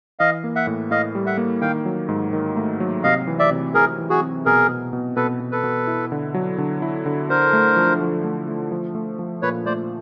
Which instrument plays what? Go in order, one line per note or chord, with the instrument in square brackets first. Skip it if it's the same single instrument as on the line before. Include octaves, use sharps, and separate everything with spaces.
[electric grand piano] E3 [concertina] D#5 F5
[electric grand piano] A#3
[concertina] E5 F#5
[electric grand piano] A2
[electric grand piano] A2 [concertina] D#5 F5
[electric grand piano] G3
[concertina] E5 F#5
[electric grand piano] A#3
[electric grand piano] D#3 [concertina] F5 G5
[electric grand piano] F#3
G#2
D#3
A3
F#3
[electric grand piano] C3 [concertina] D#5 F5
[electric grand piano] E3
[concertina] D5 E5
[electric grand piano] C3
[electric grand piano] E3 [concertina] G#4 A#4
[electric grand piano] E3
[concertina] F#4 G#4
[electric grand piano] C4
[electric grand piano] B2 [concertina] G#4 A#4
[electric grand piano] B2
B2
[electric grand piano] B2 [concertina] A4 B4
[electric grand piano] B2
[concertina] A4 B4
[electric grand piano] B2
E4
D3
F#3
D3
E4
D3
[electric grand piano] D4 [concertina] A#4 C5
[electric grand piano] A3
F3
F3
A3
A3
F3
A3
F3
[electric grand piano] A#2 [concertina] B4 C#5
[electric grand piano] A3 [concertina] C5 D5